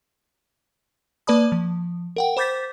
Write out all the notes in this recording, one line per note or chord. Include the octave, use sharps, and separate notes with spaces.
A#3 B4 D5 A5 B5 D#6
F3
A#4 F#5 G5
C5 B5 D6 G6 A6 B6